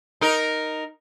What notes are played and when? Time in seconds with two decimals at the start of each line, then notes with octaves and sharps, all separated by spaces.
0.21 D#4 A#4